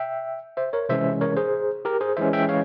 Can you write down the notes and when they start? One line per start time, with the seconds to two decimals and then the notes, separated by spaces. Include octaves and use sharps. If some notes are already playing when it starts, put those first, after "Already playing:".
Already playing: E5 G5
0.57 C5 E5
0.73 A#4 C#5
0.89 C3 E3 G#3 C#4 C5 E5
1.21 A#4 C#5
1.37 G#4 C5
1.85 G4 A#4
2.01 G#4 C5
2.17 E3 G#3 C#4 C5 E5
2.33 E5 G5
2.49 C#5 F5